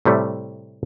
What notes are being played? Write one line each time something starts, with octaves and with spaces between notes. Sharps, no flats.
A2 C3 G3 A3